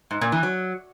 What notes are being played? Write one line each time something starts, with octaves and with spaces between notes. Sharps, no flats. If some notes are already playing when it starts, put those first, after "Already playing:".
G#2
A#2
E3
F#3